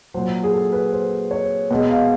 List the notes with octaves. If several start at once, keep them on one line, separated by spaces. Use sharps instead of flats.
A#2 F#3 C5
G#4
A4
B4
C5
C#5
B2 G#3
F5